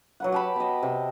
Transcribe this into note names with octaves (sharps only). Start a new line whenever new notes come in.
F#3 B4 F#5
G4 A5 B5
B3 D#5
C3